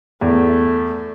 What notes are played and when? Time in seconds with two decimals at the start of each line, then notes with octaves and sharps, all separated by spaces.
0.21 E2 A3